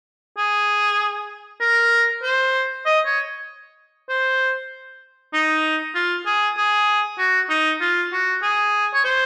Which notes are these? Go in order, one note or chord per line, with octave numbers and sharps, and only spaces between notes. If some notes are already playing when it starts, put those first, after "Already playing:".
G#4
A#4
C5
D#5
C#5
C5
D#4
F4
G#4
G#4
F#4
D#4
F4
F#4
G#4
C#5
C5